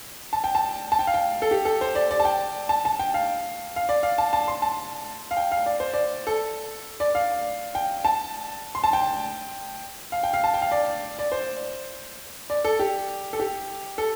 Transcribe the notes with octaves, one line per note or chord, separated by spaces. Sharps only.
A5
G5
A5
A5
G5
F5
G5
A4
G4
A4
C5
D5
D5
A5
G5
A5
A5
G5
F5
F5
D5
F5
A5
A5
C6
A5
F5
G5
F5
D5
C5
D5
A4
D5
F5
G5
A5
C6
A5
G5
F5
G5
F5
A5
G5
F5
D5
D5
C5
D5
A4
G4
A4
G4
A4